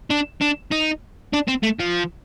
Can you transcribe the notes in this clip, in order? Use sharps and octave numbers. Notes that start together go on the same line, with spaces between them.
D4
D4
D#4
D4
C4
A3
F3